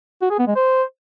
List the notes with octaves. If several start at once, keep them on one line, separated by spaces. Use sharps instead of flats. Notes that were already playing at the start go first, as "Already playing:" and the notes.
F#4
G#4
B3
G#3
C5